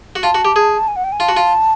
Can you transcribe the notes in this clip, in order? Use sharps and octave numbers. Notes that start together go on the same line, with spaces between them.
F#4
F4 A5
F#4
G4
G#4
G#5
F#5
G5
G#5
F4 A5
F#4
F4